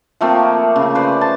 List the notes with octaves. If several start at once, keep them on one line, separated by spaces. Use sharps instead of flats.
F3 A3 A#3 C4
C#3
B4 C5 D5
A5